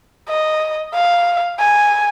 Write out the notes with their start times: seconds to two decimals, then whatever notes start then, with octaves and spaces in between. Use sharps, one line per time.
0.29 D#5
0.94 F5
1.60 G#5